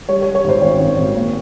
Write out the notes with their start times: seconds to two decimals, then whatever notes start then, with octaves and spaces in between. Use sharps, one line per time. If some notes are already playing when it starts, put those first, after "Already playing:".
0.09 G3 C#5
0.22 C#5
0.26 G3
0.35 C#5
0.44 G#1 C5
0.61 G#1 C#5
0.80 G#1
0.97 G#1
1.15 A#3